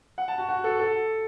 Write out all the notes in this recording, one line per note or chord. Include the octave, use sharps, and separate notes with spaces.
F#5
A5
F#4
F#4
A4
A4